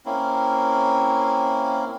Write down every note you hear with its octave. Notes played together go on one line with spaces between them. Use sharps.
A#3 C4 C#4 E4